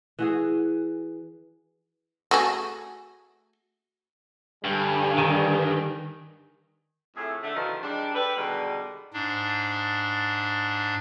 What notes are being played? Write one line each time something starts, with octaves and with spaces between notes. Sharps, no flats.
E3 F#4 G#4
A3 F#4 G#4
G2 D3 G3 G#5
D#3
F2 A2 A3 G#4
D3 A3
E2 B2 D#3 F3
D#3 G3 G#3 D4
G4 A4 B4
B2 D3 D#3 G3 G#3
G#2 D4